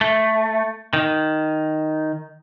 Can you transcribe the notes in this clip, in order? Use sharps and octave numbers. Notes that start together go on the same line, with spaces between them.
A3
D#3